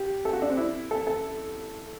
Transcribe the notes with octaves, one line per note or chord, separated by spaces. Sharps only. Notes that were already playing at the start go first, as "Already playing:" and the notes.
Already playing: G4
A4
F#4
D4
C4
E4
A4
A4